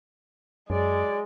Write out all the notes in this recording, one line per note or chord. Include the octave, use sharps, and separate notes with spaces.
F#2 F#3 G#3 D5